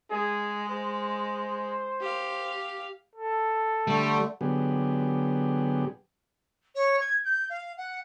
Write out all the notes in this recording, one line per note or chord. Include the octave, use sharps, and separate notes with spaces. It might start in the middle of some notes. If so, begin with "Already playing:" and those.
G#3 G#4
C5
G4 F5
A4
D3 G3 A3
D3 F#3 B3 G4 G#4
C#5
G#6
G6
F5
F#5